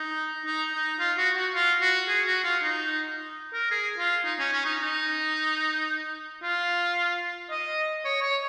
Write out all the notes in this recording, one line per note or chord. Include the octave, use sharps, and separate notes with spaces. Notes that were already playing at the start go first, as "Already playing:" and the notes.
Already playing: D#4
D#4
D#4
F4
F#4
F#4
F4
F#4
G#4
F#4
F4
D#4
A#4
G#4
F4
D#4
C#4
C#4
D#4
D#4
F4
D#5
C#5
C#5